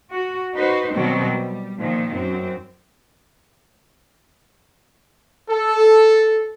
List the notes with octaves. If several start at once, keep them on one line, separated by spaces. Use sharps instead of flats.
F#4
D#4 F#4 B4 C5
B2 D#3 F#3 G3 C4
G3
A#2 D#3 F3
F#2 C4
A4